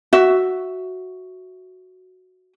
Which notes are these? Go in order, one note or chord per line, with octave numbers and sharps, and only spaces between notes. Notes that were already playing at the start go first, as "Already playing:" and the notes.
F#4 E5